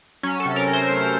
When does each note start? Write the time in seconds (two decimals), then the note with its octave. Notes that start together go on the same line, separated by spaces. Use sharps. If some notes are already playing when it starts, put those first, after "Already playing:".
0.23 F#3 C#4
0.40 A4
0.46 C3
0.56 A#4
0.68 C3
0.73 C5
0.90 A3